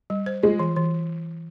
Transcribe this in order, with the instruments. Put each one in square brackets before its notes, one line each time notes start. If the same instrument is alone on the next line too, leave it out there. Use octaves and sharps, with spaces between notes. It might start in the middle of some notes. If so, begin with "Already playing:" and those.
[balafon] G3
C5
[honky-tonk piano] G#3 [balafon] F4
[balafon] E3
E3